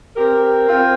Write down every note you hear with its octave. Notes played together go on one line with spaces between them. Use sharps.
C4 G4 A#4
C4 F4 A#4